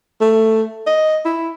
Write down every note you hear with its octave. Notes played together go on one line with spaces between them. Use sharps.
A3
D#5
E4